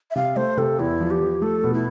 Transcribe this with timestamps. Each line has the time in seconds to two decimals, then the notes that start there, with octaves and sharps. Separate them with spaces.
0.11 E5
0.16 C3 F5
0.36 A3 C5
0.57 C3 A4
0.79 E2 E4
1.00 F3
1.11 G4
1.21 F3
1.42 A3 A4
1.64 B2
1.74 E4